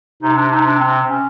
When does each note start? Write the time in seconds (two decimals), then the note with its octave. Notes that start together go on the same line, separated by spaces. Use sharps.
0.22 C3 D#4
0.36 D4
0.52 D#4
0.66 D4
0.81 C4
1.09 C#4